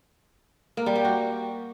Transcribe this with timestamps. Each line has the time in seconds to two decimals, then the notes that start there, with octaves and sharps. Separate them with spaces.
0.77 A#3
0.86 G3
0.95 G4
1.05 F#4